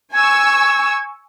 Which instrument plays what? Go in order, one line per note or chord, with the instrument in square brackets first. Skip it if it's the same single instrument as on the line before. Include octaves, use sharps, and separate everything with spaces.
[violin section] G#5 C#6 E6 [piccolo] G#6